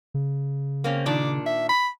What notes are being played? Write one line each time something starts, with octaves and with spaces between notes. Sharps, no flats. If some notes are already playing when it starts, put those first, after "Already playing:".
C#3
A#3 C4 C#4
A#2 D#3 D4 D5
E5
B5